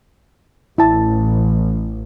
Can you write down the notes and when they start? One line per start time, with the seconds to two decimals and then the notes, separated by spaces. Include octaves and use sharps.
0.78 A1 E4 A5